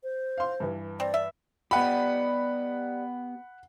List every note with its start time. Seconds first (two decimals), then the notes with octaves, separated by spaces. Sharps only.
0.03 C5
0.38 F5 C6
0.60 G2 E3
1.00 C4 D5
1.14 E5
1.71 G3 B3 D#4 G4 F#5 B5